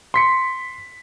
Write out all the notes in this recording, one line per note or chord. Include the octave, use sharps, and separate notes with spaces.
C6 B6 C#7